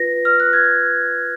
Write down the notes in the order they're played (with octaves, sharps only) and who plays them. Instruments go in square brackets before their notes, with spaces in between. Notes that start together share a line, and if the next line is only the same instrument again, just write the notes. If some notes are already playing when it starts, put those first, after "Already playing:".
Already playing: [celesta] F4 B4 A#6
F6
F#6
G#6